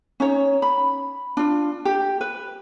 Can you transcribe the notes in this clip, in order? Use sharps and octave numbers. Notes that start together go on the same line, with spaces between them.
C#4 D#4 C#5
B5
D4 F4
G4
B4